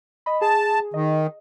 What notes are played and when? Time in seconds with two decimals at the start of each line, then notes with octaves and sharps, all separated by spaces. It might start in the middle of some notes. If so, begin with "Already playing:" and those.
0.26 D#5 B5
0.41 G#4 A5
0.94 D#3 D#5